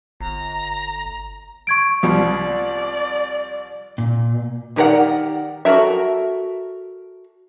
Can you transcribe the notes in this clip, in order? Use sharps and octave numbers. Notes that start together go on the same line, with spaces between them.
G1 A#5
C#6 G#6 D7
C2 F3 G3 D5
A#2
D#3 G4 A#4 D5 F#5
F#4 A4 A#4 E5